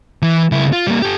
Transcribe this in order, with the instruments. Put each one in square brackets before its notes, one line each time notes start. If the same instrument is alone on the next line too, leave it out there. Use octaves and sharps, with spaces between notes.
[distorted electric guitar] E3
C#2 E4
F4
G3 A#3
G4 A4